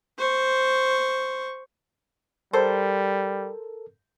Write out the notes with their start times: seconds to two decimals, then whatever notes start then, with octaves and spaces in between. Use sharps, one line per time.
0.19 C5 C#6
2.53 G3 A4 A#4 C5